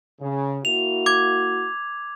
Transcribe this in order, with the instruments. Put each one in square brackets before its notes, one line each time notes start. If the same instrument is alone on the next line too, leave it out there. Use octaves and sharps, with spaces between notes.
[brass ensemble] C#3
[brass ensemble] A#3 E4 F#4 [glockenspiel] F7
[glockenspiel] D6 G#6